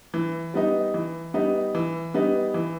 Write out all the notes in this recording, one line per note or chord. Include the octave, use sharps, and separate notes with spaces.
E3
G3 B3 D#4
E3
G3 B3 D#4
E3
G3 B3 D#4
E3